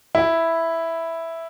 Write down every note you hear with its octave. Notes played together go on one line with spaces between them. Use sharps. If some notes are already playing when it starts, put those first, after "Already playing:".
E4